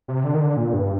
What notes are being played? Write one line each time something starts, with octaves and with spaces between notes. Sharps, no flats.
C3
D3
D#3
D3
A#2
G2